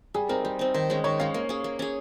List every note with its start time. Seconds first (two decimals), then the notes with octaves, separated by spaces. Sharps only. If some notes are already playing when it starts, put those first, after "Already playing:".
0.14 G3 G#4
0.29 C4 D#4 A#4
0.44 G3 C5
0.59 C4 D#4
0.74 D#3 C5
0.90 G#3 C#4
1.04 D#3 C#5
1.20 G#3 C#4 F5
1.34 A#3
1.49 C#4 G#4
1.64 A#3
1.79 C#4 G#4